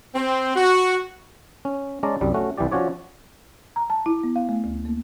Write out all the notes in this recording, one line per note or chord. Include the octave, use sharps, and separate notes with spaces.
C4
F#4
C#4
G#3 C#4 D5 A5 A#5
C2 F#2 G3
A3 C#4 F#4
C2 E3 G3 G4 D5
F3 C#4 F#4 C#5 D5
A#5
A5
E4
B3
F5
A3
D2
A#3